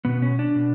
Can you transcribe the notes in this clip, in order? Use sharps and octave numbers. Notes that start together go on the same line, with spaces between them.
B2 B3
C#4
D4
B2